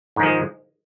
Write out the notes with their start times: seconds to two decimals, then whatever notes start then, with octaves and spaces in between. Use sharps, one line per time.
0.16 G#2
0.20 D#3
0.23 F3
0.26 G#3